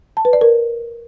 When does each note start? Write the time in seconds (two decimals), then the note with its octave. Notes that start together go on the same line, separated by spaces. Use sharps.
0.17 A5
0.25 B4
0.33 D5
0.41 A#4